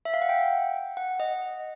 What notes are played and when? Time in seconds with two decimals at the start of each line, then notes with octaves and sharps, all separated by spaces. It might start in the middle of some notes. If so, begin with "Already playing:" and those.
0.05 E5
0.14 F5
0.22 F#5
0.29 G5
0.97 F#5
1.20 D#5